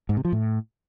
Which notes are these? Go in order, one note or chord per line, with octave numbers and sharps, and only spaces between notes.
G#2
C3
F3
A2